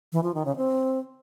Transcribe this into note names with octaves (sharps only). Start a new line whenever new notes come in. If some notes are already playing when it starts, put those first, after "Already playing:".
E3
F3
D#3
C#3
C4